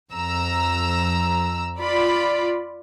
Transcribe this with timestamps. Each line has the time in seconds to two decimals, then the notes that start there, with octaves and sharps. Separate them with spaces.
0.11 F2 A#5 E6
1.78 F4 D5 B5